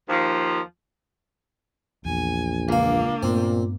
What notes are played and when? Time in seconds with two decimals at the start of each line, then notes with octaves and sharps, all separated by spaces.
0.09 D#2 F3
2.05 A#1 E2 G#5
2.69 C#2 A#3 D4 F5
3.23 G2 A#2 A3 B3 C4